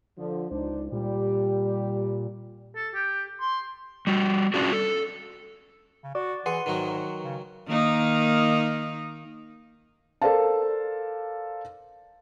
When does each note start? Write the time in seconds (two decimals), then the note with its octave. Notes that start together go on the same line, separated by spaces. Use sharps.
0.17 D3 F3
0.51 C#2 D4 D#4 C5
0.92 A#2 G3 G4
2.75 A4
2.94 G4
3.40 C6
4.07 G3 F#4
4.54 G3 C#4 D4 F4 F#4 G#4
4.72 A4
6.04 C#3
6.15 F#4 D5 D6
6.46 E3 G#4 B4 F#5 C6
6.66 G#2 D#3 F#3 F#4
7.24 C#3
7.68 D#3 A#3 D#4
10.22 A4 A#4 C5 D5 F5 A5